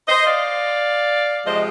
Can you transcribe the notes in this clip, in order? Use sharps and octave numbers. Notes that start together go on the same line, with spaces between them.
C5 D#5
D5 F5
C3 F3 G#3 C5 D#5